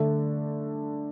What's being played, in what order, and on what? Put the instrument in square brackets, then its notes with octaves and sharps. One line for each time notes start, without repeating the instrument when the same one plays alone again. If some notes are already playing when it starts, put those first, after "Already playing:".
Already playing: [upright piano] D3 A3 D4 A4